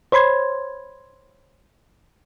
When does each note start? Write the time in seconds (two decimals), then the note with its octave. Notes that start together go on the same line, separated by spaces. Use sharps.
0.12 C5 C#5 B5 C6 G#6